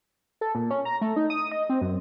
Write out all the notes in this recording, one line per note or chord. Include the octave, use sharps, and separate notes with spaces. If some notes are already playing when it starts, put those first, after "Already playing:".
A4
A#2
C#4
A#5
A3
D#4
D#6
D#5
C4
F#2